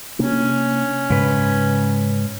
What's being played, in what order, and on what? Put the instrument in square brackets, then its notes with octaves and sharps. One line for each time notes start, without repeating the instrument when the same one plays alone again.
[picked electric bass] C3 A#3 D4 [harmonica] C#4
[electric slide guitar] G#2 B4 [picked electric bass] C#3